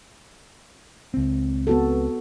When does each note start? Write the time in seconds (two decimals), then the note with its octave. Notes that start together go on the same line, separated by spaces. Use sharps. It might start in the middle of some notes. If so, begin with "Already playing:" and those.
1.14 C#2 C4
1.67 B3 F#4 A4